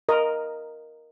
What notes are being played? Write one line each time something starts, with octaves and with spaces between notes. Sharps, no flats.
A#4 D#5